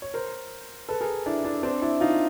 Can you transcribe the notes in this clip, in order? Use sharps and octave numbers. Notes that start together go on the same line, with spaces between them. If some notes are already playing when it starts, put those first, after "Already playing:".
C#5
A#4 C5
A4 B4
G#4 A#4
D4 E4
D4 E4
C4 D4
D4 E4
D#4 F4